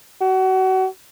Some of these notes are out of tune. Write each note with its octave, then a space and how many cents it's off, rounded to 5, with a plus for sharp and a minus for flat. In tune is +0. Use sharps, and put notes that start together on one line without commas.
F#4 +30